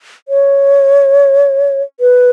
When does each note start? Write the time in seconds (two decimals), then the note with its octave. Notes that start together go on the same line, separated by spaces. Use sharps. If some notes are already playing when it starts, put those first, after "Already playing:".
0.28 C#5
2.00 B4